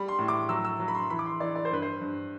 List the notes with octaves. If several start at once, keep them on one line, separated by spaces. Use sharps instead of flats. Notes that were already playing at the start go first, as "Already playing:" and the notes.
Already playing: G3 B5
C6
A2
D6
F#3 E6
E6
F#3
B5
C6
E3 B5
D6
C6
E3 D5
D5
C5
G2 B4
C5
G2